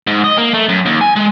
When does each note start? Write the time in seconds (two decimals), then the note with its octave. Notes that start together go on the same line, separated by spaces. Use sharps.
0.07 G#2
0.24 D#5
0.38 A#3
0.54 A3
0.69 F#2
0.86 D#2
1.01 G#5
1.16 G#3